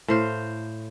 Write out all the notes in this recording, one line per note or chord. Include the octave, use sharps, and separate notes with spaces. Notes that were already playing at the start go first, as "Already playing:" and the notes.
A2 C5 F5